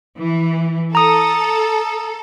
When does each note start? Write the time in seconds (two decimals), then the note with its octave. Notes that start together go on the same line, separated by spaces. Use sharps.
0.18 E3
0.95 A4 A#5 D#6